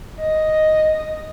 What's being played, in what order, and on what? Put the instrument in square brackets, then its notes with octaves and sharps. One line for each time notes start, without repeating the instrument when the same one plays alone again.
[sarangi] D#5